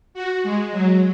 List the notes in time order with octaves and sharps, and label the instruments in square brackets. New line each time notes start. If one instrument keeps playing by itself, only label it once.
[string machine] F#4
G#3
F#3